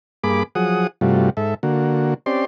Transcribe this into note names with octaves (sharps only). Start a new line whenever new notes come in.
G2 A#3 G#4 B5 D6
F3 F#3 G#4 F#5 D#6
G2 C3 G3 A3 F4 F#4
G#2 A4 E5
D3 A#3 F#4
C4 C#4 G4 D5 C6